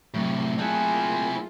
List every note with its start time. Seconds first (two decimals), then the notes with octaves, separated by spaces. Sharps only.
0.14 A2 C3 F#3
0.59 A3 A#3 C4 E4 F4 G#4 F#5 G#5